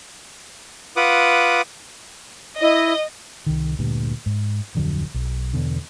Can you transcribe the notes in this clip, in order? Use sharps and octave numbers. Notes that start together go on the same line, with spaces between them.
F4 B4 F#5 D6 D#6
E4 D#5
C2 D#3
D2 G2 A#2
G#2
D1 F2 D3 F#3
B1
E2 B2 D3